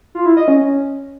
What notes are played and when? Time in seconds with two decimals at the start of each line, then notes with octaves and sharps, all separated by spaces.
0.15 F4
0.26 E4
0.37 D#5
0.48 C#4